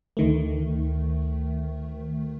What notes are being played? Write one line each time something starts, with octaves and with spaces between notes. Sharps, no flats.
D2 D#3 A3